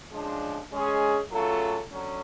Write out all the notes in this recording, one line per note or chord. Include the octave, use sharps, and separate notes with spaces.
C#3 F3 G#3 D4
G#3 C#4 G#4
C#3 F#3 A3 F4 A4
D3 F#3 C#4